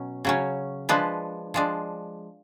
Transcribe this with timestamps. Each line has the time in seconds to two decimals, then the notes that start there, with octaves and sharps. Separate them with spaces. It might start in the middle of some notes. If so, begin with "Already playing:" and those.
Already playing: B2 F#3 C#4
0.25 C#3 F#3 C#4
0.89 F3 G#3 D4 B4
1.54 F3 G#3 D4